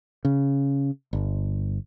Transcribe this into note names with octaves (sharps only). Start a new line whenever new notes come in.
C#3
G1